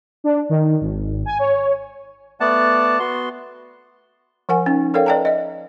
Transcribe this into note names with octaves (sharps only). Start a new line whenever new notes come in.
D4
D#3
G#1
G#5
C#5
A3 B3 D5 F#5 A5
B3 F#4 C6
F3 A#4 F#5 G#5
C#4 D#4
A4 A#4 C#5 D5 F5 G5
B4 D5 D#5 G5 A5 A#5
D#5 E5